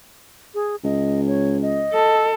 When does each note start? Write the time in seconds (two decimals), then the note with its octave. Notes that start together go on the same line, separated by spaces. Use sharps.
0.55 G#4
0.84 C#2 D#5
1.27 C#5
1.62 D#5
1.94 A4